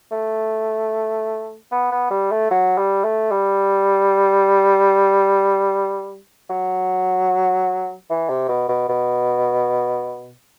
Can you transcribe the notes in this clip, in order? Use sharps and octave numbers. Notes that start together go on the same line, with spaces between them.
A3
B3
B3
G3
A3
F#3
G3
A3
G3
F#3
E3
C3
B2
B2
B2